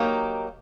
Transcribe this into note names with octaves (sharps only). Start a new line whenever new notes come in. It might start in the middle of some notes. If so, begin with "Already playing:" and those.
Already playing: F#3 A#3 D#4 G4